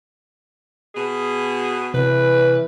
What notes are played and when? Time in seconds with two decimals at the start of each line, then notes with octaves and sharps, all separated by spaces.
0.95 B2 G#4
1.94 C3 E3 B4